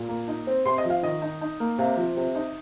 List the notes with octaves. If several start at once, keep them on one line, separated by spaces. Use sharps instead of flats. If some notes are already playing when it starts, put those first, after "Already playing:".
Already playing: A#2
A#3
D#4
C4
C3 C6
D#5
F3
F5
D#3 D#5
D#4
D#4
A#3
C3 F5
F3
C3
D#4